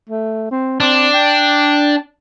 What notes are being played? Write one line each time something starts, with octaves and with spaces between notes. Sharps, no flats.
A3
C4
C4 D4
G5